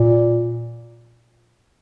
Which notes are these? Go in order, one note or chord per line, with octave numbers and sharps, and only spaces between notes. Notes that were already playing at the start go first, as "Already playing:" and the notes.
Already playing: A#2